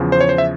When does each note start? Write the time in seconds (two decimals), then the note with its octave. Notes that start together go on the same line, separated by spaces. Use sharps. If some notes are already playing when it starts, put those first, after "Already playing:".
Already playing: E2 C#3 F3
0.12 C5
0.21 C#5
0.29 C5
0.38 E5